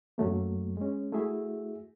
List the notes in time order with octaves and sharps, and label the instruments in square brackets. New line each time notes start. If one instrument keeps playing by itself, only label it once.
[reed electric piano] F#2 F#3 A3 A#3
G#3 C#4
A3 E4 F#4 G#4 E5